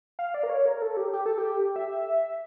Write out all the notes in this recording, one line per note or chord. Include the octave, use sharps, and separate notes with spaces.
F5
D5
A#4
C#5
A#4
A4
G4
G4
A4
G4
E5